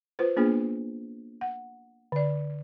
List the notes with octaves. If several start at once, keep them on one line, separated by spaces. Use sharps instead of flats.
F4 B4 C5
A#3 B3 D4 F4 G#4
F#5
D3 D5